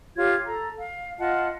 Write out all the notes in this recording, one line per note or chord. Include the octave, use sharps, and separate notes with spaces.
F4 G4 C#5 G#6
A4 A#5
F5
F4 D#5 F#5 A5